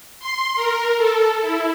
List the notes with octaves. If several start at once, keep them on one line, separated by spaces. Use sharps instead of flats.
C6
A#4
A4
E4